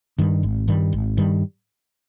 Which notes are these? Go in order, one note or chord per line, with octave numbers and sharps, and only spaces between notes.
G2 D#3 G3
G#1
G2 D#3 G3
G#1
G2 D#3 G3